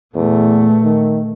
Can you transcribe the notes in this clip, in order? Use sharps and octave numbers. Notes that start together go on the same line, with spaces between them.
E2 A#2 A3
D#3